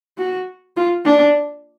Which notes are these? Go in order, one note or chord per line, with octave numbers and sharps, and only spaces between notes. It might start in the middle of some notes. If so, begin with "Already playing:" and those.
F#4
F4
D4